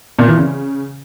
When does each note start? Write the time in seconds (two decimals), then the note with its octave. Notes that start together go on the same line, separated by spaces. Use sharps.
0.19 A#2
0.28 E3
0.37 C#3